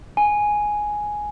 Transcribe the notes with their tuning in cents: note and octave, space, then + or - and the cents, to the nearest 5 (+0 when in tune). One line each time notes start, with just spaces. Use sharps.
G#5 +5